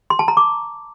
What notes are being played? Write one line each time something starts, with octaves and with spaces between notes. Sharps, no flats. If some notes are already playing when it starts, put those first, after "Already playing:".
C6
A5
A#5
D6